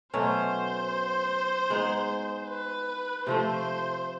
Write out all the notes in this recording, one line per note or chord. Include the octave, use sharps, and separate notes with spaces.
B2 F#3 A3 C#4 C5
G#3 B3 D#4 G#4
B4
C3 F3 A3 C5